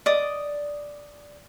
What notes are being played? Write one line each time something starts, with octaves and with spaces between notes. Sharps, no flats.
D5 D#5 D#6